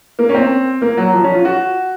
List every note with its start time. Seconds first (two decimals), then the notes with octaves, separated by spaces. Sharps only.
0.19 A#3
0.29 C#4
0.35 C4
0.82 A#3
0.97 F#3
1.14 F3
1.24 C#4
1.34 F4
1.45 F#4